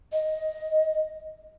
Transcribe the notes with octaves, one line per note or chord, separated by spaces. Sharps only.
D#5